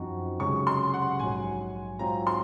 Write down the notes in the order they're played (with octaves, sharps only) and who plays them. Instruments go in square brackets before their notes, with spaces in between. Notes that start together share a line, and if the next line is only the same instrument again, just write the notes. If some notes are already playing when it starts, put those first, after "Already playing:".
Already playing: [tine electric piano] F#2 F3 C4 D#4 F#4
[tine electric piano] C#2 C3 F#3 C#4 G#4 [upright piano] C#6
[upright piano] C6
F#5
[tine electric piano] A#1 G#2 F#3 [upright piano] G#5
[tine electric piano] G#2 F#3 C4 F4 [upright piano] A#5
[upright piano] C6